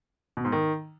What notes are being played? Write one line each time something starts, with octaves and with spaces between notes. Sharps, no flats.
B2
G#2
D#3